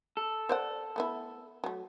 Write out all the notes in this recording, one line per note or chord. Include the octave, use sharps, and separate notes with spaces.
A4
C5 D5 F#5
A3 B3 E4
F#3 A3